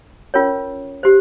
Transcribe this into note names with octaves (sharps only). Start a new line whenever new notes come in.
C#4 F4 A#4 C#5
G4 C5